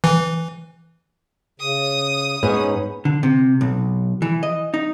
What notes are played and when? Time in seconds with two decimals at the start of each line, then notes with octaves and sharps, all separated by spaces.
0.04 E3
1.60 C#3 D#6
2.43 G#2 B3 C#4 D#4 G#4 C#5
3.05 D3
3.23 C3
3.61 B1
4.22 E3
4.43 D#5
4.74 D#4